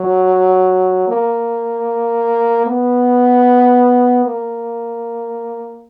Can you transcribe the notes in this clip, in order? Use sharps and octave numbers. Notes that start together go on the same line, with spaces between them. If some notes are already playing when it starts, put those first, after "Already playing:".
Already playing: F#3
A#3
B3
A#3